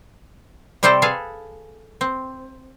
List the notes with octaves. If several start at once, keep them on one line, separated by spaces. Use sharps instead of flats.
C3 G3 C4 G4 A4 C5
G#4 A4 B4 F5
C4